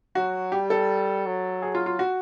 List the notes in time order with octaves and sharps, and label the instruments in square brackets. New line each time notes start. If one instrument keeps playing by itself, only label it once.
[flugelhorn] F#3 [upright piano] F#4
[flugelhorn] G3 [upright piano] G4
[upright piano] A4
[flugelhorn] F#3
[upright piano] G#4
F4
F4
F#4